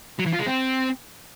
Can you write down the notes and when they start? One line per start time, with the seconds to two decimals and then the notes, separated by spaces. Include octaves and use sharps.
0.19 F#3
0.26 E3
0.33 F4
0.40 G#3
0.47 C4